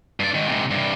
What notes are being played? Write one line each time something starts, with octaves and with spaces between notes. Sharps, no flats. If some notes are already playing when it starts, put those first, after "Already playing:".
G2 D5
G#2 D#3
G#2 C3
G2 C3